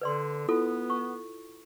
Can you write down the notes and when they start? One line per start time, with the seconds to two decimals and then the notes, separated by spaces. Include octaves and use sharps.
0.01 D3 B4 D5 C6
0.48 B3 E4 F4 A4
0.90 C#6